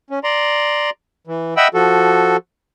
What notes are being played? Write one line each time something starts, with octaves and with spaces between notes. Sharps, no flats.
C#4
D5 A#5 C6
E3
D#5 E5 F#5 G5 B5 E6
F3 F#4 A4